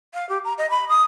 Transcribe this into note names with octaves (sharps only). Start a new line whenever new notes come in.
F5
G4
A#5
D#5
B5
D#6